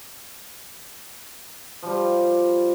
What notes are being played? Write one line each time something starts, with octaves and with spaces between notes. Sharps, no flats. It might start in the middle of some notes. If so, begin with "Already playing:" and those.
F3 G3